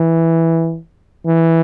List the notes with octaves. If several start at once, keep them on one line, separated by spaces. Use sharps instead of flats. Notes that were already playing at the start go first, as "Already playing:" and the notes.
Already playing: E3
E3